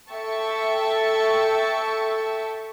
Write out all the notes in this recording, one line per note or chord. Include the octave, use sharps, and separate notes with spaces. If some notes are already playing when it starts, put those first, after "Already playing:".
A4 E5 G5 A5 C#6 A6